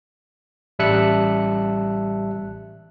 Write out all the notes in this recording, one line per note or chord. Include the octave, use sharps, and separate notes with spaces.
A1 G3 E5 A5 F#6 C#7